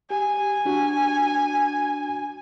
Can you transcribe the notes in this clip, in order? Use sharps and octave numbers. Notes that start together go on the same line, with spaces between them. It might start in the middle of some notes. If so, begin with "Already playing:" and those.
G4 G#5
D4 F#4